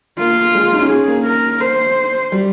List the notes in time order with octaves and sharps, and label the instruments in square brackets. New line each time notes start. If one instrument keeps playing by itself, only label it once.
[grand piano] A#3 [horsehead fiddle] F4
[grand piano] G#3
D#4
C#4
[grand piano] C#4 [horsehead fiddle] G#4
[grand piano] A#3
[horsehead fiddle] A#4
C5
[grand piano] G3